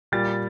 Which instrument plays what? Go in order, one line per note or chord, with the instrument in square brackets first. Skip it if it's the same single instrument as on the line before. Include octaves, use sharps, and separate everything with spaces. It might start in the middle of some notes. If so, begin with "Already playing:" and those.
[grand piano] A#2 G3 A6